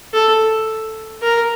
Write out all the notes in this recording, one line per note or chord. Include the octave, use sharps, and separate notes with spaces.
A4
A#4